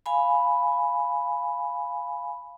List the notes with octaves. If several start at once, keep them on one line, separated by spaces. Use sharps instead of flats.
F5 G#5 B5